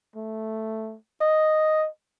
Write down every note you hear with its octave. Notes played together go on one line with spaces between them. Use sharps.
A3
D#5